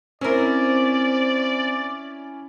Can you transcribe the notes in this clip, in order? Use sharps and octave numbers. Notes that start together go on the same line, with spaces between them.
C4 C#4 E4 A#4 D5